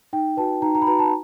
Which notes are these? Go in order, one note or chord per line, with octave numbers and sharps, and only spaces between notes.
D#4 G5
F#4 B4 A5
D#4 A#5
A#5
B5
F#4 B4 A#5
A5